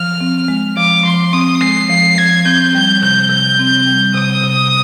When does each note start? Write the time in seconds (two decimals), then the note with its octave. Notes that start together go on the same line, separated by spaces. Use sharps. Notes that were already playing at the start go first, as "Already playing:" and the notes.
Already playing: F3 F6
0.21 C4
0.48 G#3
0.77 F3 D6
1.05 F3 C6
1.33 C4 D#6
1.61 G#3 C7
1.90 F3 C7
2.17 F3 G#6
2.46 C4 G6
2.74 G3 G6
3.02 C3 G6
3.30 C3 G6
3.59 C4
3.86 G3
4.15 C3 D#6
4.43 C3